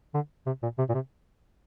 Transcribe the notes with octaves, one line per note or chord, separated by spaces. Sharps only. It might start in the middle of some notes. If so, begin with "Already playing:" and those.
D3
C3
A#2
C3
A#2
C3